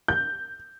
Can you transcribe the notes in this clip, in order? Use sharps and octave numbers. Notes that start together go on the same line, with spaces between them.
G6